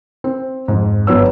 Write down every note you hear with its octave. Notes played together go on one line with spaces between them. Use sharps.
C4
F2 G#2
G1 F#3 B3 C#5 E6